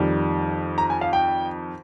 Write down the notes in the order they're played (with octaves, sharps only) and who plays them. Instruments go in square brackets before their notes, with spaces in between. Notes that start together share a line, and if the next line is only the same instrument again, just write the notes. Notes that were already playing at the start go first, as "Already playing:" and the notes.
Already playing: [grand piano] F2 D#3 G3
A#5
G#5
F5
G5